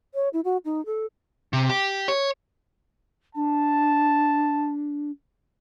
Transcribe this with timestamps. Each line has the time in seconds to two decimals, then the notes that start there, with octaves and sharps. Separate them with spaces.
0.14 C#5
0.33 E4
0.45 F#4
0.65 D#4
0.86 A4
1.53 C3
1.69 G4
2.08 C#5
3.35 D4 A5